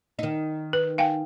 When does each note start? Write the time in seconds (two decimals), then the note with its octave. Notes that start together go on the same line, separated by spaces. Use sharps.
0.19 D#3 D#4
0.73 B4
0.98 F5 G5 G#5